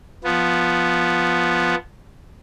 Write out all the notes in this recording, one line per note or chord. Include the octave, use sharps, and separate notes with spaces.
F3 B3